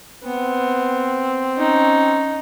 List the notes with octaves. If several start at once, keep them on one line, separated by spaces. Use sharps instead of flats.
B3 C4
C#4 D#4